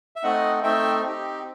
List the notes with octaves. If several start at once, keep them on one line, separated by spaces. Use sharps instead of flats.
E5
A3 C4 D#4 D#5 F#5
A3 C4 D#4 E5 G5
C4 D#4 G4